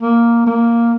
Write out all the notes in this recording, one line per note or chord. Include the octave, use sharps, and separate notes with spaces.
A#3
A#3